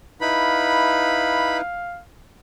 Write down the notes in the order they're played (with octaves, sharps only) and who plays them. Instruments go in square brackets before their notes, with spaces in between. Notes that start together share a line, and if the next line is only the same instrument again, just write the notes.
[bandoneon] D#4 E4 B4 [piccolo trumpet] F5 [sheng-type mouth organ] B5